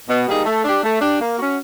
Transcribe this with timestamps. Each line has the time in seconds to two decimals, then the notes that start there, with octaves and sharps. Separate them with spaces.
0.08 B2
0.28 G3 A#3 D#4 G#4
0.45 A3
0.64 D4 G4
0.83 A3
1.01 D4 G4
1.20 A#3
1.39 C#4 F#4